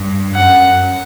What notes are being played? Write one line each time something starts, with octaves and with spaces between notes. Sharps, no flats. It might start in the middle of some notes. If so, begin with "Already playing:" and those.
Already playing: G2
F#2 F#5